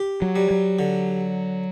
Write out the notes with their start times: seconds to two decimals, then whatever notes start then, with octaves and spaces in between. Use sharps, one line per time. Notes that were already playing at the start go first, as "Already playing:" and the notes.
Already playing: G4
0.22 F#3
0.36 G3
0.51 F#3
0.79 D3